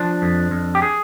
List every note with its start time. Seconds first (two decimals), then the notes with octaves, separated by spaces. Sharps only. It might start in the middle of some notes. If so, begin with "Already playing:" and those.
Already playing: F3 D4
0.22 F2
0.51 F2
0.75 G4
0.82 G#4